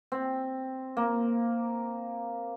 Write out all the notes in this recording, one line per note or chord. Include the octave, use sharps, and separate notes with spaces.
C4
A#3